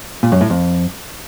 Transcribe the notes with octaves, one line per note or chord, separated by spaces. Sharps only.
A#2
F#2
A2
F2